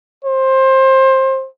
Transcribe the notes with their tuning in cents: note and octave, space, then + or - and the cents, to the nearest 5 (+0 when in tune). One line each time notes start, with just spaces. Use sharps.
C5 +20